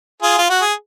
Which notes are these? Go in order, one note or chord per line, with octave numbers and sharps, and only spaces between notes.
F4 G#4
F4
F#4
G#4